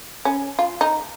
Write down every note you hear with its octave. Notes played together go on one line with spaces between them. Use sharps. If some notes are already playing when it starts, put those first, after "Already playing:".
C#4
F4
D#4